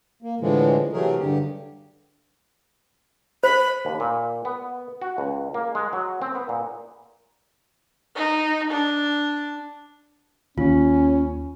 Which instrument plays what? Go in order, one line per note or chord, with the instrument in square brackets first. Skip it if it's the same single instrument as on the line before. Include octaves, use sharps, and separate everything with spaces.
[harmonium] A#3
A2 D3 E3 F3 G#3
C3 E3 F#3 A3 G#4 A#4
G2 D3 G4
[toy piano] C5 [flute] B5
[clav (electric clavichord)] D#2
A#2
B3
F#4
C#2
A#3
G#3
F#3
C4
B3
A#2
[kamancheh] D#4
D4
[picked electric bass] D#2 [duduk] C#4 [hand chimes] F4